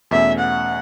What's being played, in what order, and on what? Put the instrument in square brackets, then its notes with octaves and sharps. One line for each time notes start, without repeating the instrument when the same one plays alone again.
[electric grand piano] E2 B2 A3 C#4 [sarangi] E5
[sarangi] F#5